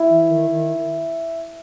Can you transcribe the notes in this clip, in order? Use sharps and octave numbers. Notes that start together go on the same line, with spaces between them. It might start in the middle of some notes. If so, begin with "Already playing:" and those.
Already playing: E4
E3
D#3
D#3